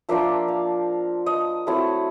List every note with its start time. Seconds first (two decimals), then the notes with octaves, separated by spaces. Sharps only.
0.09 F3 A#3 D4 F4 E5
0.48 F5
1.26 D#5
1.67 F#3 A3 C4 E4